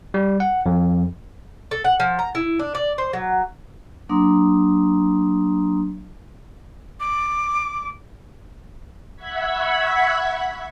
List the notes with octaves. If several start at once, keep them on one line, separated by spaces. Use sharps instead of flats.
G3
F#5
F2
A4
F#5
F3
A#5
E4
D4
D5
C5
F#3
F#3 A#3 D4 A#5 C6 D#6
D6
E5 F#5 B5 C#6 G#6 B6